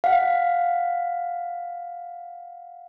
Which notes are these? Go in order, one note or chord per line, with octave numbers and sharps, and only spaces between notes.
F5 F#5